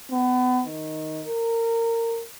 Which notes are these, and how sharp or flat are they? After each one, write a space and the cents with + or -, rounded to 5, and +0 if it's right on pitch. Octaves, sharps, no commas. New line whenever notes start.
B3 +30
D#3 +5
A#4 -25